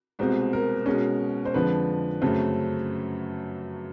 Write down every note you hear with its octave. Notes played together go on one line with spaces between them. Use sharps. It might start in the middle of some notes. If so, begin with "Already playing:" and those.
C2 B2 G#3 C4
A#4
B2 G#3 C#4
C5
F2 D3 F3 G#3 B4
F#2 C#3 F#3 A3 C4